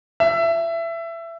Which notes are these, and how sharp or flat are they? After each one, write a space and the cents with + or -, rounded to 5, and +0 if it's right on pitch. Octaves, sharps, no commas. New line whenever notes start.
E5 +20